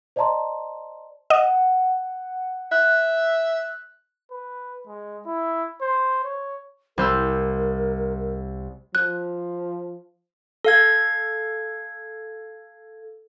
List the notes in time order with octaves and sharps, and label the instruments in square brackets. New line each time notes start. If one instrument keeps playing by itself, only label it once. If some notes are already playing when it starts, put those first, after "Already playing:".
[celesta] C5 D5 D#5 A5 A#5 C6
[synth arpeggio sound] D#5 [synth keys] F#5
[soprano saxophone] E5 [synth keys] F#6
[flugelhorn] B4
G#3
E4
C5
C#5
[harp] C2 C5 E6 [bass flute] A#4
[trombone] F3 [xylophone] F#6
[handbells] A4 F5 G#6